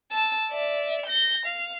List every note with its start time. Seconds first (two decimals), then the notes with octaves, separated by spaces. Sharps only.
0.11 A5 E6
0.51 D5 E5
1.06 G6 A#6
1.46 F5